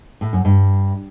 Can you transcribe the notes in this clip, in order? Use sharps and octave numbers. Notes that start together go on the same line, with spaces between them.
A2
F#2
G2